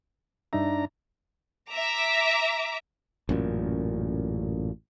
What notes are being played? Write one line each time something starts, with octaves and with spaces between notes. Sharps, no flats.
G2 D4 D#4 E5 A#5
E5 A#5 D6
A1 F#2 A#2